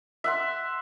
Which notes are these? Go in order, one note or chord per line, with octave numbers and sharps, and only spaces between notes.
E5 F#5 C6